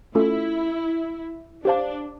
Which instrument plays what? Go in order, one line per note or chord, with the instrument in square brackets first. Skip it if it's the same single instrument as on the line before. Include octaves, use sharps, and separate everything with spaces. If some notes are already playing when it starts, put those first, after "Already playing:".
[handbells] A3 C#4 F4 A4 [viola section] E4
[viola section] D4 [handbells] G4 C5 F5 A5